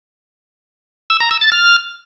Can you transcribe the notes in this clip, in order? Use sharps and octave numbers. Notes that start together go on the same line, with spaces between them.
E6
A#5
E6
A6
F6